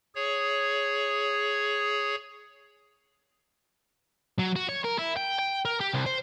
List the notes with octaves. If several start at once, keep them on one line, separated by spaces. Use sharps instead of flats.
G#4 C#5
F#3
F#4
C#5
A#4
E4
G5
G5
A#4
G4
C2
C5